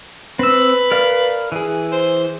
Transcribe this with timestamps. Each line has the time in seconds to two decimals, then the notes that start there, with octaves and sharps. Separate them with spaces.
0.39 C4 B4 E6
0.92 A#4 D5 F5
1.52 E3 G#4
1.92 C5